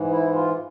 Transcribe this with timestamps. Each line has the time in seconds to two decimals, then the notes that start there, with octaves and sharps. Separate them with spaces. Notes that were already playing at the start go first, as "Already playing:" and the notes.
Already playing: G#2 E3
0.11 E4
0.34 F4